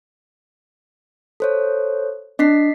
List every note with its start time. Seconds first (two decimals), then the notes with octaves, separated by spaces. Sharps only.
1.40 A4 C5 C#5
2.39 D4 D#5 B6 C7